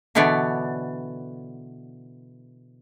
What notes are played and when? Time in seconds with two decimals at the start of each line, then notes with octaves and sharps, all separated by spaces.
0.15 B2 D3 E3 B3 C#5 D5